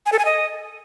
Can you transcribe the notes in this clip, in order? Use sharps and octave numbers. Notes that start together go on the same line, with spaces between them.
G#5
A4
G#5
D#5